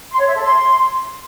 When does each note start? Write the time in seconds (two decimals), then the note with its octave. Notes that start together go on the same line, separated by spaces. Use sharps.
0.11 C6
0.19 C#5
0.27 E5
0.35 A4
0.42 C6